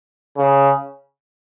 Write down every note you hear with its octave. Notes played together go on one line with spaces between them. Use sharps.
C#3